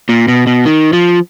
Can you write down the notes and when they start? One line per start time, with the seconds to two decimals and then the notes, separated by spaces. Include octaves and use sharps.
0.09 A#2
0.28 B2
0.47 B2
0.66 D#3
0.93 F3